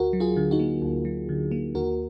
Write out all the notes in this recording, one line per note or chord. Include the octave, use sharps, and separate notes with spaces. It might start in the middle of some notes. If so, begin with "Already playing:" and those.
Already playing: D2 F#4 A#4
F#3
F4 G#4
D3
D#4 F#4
A#3
D2
F#3
D3
A#3
D#2 F#4 A#4